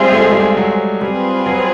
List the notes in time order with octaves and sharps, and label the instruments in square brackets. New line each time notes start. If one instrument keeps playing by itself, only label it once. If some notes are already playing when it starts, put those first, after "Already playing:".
Already playing: [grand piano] G3 G#3 [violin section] C4 F4 G#4 C5 E5
[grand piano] A3
G#3
G3
G#3
F#3
[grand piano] G3 [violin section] C4 F4 G#4 B4
[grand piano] F#3